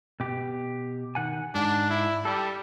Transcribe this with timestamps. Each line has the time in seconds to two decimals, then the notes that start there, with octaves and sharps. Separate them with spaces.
0.20 B2 G4
1.15 D#3 F#5 G#5
1.55 G#2 D4
1.90 E4
2.25 G3 A4